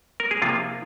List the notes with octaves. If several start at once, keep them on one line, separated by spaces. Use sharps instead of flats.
A#4
G#4
C3 F3 A#3 F4